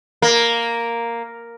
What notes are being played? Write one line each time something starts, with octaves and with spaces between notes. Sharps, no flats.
A#3